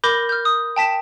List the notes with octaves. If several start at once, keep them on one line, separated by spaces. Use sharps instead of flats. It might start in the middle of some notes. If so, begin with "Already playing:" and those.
A#4 B5 D6 G6 A#6
F6 G6
D#6
G5 A5 B6 E7